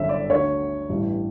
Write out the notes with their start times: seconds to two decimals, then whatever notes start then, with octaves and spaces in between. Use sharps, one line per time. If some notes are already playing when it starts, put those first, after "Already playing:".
Already playing: G1 F#2 D3 E5
0.09 D5
0.30 D2 D3 C#5
0.89 A1 G2 E3